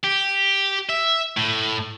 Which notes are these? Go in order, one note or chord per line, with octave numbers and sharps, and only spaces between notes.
G4
E5
A2